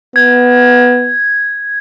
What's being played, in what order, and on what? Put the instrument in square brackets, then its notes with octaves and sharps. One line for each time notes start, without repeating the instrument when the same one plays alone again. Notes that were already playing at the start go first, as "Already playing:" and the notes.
[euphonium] B3 [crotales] G#6